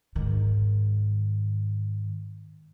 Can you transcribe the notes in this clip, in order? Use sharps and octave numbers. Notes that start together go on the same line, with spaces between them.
G#2 D#3